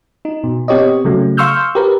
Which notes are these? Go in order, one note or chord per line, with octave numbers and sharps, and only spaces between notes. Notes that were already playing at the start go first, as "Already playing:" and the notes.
D#4
B2
B3 C4 G4 C#5 D#5
C#3 F#3 A3
F5 C6 C#6 E6 F6 G6
G4 A#4 B4